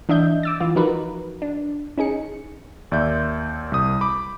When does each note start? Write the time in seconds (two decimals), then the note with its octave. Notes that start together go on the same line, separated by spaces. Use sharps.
0.09 E3 D4 D#5 E5 G6
0.43 D6 E6 A6
0.60 E3 F4
0.76 F3 D#4 F#4 A#4 B4
1.42 D4
1.98 C#4 D#4 G#4 C#7
2.92 D#2 D5 E5 G6
3.72 C2 D#6
4.01 B5 D6